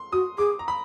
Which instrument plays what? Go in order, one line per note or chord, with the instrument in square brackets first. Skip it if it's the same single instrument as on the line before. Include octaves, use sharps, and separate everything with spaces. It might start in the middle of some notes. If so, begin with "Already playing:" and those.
Already playing: [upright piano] C6
[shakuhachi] F#4 [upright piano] D#6
[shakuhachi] G#4 [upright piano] D6
[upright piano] A#5
B5